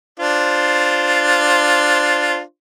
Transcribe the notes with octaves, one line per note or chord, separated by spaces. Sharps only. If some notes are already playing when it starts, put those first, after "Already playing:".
D4 F4 C5